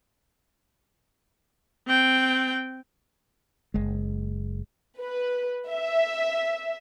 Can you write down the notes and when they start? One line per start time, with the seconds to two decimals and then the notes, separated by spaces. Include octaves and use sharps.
1.87 C4 G5
3.74 F#1 G#3
4.99 B4
5.70 E5